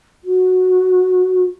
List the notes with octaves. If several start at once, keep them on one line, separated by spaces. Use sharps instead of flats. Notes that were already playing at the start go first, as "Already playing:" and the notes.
F#4